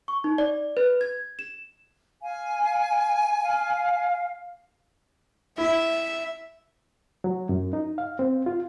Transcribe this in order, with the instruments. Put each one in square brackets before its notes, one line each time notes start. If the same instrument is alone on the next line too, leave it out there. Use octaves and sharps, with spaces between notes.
[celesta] C#6
D#4
D5
B4
G#6
E7
[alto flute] F5 [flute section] G#5
[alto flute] F5
[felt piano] E4 [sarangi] E5
[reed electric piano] F#3
F#2
D#4
F5
C4
F4